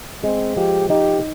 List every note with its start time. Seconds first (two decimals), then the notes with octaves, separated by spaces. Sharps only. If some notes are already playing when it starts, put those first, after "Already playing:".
0.23 G#3 C4
0.56 F3 G4
0.90 D#4 G4